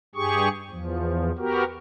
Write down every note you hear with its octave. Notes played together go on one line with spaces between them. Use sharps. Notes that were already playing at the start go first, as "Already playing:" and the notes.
G2 G4 G#4 C#6
E2 F3
B3 F#4 G4 A#4